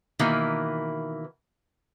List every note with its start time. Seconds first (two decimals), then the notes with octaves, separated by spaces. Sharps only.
0.19 B2 D#3 E3 A#3 E4